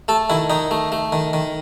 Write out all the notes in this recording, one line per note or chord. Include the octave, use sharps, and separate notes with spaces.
A3 A4
D#3 E4
D#3 D#4
A3
A3
D#3
D#3